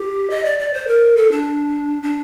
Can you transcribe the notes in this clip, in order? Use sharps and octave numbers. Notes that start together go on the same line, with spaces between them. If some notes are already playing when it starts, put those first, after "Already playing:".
Already playing: G4
D#5
D5
D5
C5
A#4
A4
D4
D4